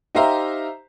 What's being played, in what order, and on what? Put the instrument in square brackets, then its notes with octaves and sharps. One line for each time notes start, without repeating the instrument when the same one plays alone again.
[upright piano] D#4 G4 C5 E5 F5 A#5